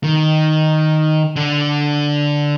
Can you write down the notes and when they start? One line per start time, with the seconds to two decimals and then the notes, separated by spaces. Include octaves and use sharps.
0.04 D#3
1.36 D3